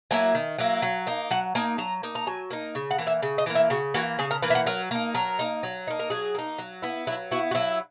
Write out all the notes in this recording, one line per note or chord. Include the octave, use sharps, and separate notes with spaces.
F#3 A#3 E4 G#5
D#3
F#3 A#3 E4
F#3
A#3 D#4
F#3 F#5
A#3 D#4 G#5
F#3 A#5
A#3 D#4
A#5
F#3 G#5
A#3 D#4
C#3
F#5
E3 A#3
E5
C#3
D#5
E3 A#3
E5
C#3 F#4
E3 A#3 F#4
C#3 G#4
A#4
E3 A#3 B4
E4
F#4
F#3 A#4
A#3 D#4
F#3 A#4
A#3 D#4
F#3
A#3 D#4
A#4
F#3 G#4
A#3 D#4
F#3
B3 E4
F#3 E4
B3 E4 F#4
F#4
F#3 E4